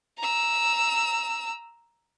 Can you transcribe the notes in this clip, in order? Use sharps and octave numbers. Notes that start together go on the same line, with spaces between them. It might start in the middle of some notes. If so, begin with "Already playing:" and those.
A#5 E6